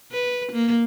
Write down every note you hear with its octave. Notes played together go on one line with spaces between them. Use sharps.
B4
A#3